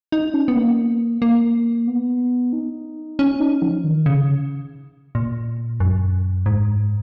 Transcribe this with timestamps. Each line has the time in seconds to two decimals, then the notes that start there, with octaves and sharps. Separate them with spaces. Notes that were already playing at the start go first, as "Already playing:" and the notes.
0.12 D#4
0.34 C#4
0.48 B3
0.56 A#3
1.22 A#3
1.87 B3
2.53 D#4
3.19 C#4
3.40 D#4
3.62 F3
3.84 D#3
4.06 C#3
5.15 A#2
5.80 F#2
6.46 G#2